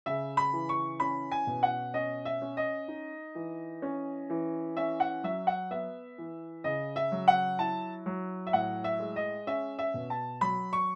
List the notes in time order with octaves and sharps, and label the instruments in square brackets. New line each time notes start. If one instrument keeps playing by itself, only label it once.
[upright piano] C#3 E5
B5
E3
C#6
C#4 B5
G#5
B2
F#5
C#4 D#5
E5
C#4
D#5
D#4
E3
C#4
E3
C#4 E5
F#5
F#3 E5
F#5
B3 E5
E3
C#3 D#5
E5
F#3
F#5
E4 A5
F#3
E5
A2 F#5
E5
G#3
D#5
C#4 E5
E5
B2
A5
F#3 B5
C#6